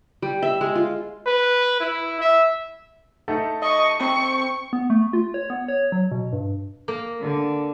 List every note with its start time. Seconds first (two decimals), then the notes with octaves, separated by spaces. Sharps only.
0.22 G3
0.42 E5
0.61 G#3
0.75 F4
1.26 B4
1.80 E4
2.21 E5
3.28 A3 D#4 A4
3.62 D#5 C#6
4.00 C4 C#6
4.73 B3
4.90 A3
5.13 F4
5.34 C#5
5.50 B3
5.68 C#5
5.92 F#3
6.11 B2
6.33 G2
6.88 A#3
7.19 D3